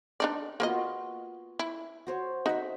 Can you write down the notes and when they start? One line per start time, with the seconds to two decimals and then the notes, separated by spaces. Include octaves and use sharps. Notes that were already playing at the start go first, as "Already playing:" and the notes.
0.20 D4 D#4 D5
0.60 A#3 B3 F4 F#4 C5 D#5
1.59 E4
2.07 F#4 C5 C#5
2.46 C4 D#4 F#4 E5